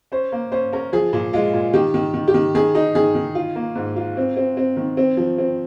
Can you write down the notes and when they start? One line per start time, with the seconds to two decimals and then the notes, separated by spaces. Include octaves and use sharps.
0.12 C#4 C5
0.32 A#3
0.52 C#4 C5
0.73 C#4 A#4
0.93 F3 G#4
1.13 A#2
1.33 G#3 F4
1.53 A#2
1.73 D#3 G4
1.94 D#3
2.14 D#3
2.28 G4
2.34 D#3
2.55 D#3 G#4
2.75 D#4
2.95 D#3 G#4
3.15 D#3
3.35 F4
3.56 A#3
3.75 G#2
3.96 F4
4.17 C4
4.37 C4
4.57 C4
4.77 D#3
4.97 C4
5.17 F3
5.38 C4